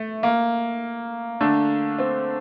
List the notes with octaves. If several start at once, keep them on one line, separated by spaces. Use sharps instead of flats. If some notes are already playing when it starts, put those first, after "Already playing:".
Already playing: A3
A#3
D3 A3 D4
C4